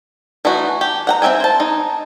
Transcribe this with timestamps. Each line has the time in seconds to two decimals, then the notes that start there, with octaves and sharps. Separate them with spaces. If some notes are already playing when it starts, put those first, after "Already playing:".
0.45 E3 A3 D#4 F#4
0.81 G4
1.07 F#5 G5 A#5
1.22 C4 A#4 E5 G5 G#5
1.40 C5 A5
1.60 D#4